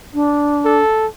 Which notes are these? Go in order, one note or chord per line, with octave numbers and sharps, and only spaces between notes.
D4
A4